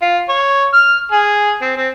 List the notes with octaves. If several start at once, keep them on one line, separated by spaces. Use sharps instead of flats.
F4
C#5
F6
G#4
C4
C4